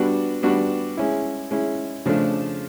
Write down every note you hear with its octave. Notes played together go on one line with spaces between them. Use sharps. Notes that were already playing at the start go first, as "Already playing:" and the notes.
Already playing: G3 B3 D4 F#4
G3 B3 D4 F#4
G#3 C#4 E4
G#3 C#4 E4
C#3 F3 A3 D4